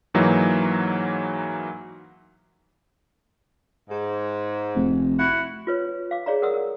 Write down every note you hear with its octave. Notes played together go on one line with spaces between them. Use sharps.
G#2 E3 F#3 A#3 D#4
G#2
F1
E4 F#4 F#5
F4 B4 C#5
F5 D6
G#4 C#5 D5 F5 A#5
A#4 F#5 D#6 E6
A#4